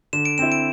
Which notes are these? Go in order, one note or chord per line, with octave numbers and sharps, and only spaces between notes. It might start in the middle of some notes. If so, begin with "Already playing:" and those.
D3 E7
D7
C4 E4 E7
D7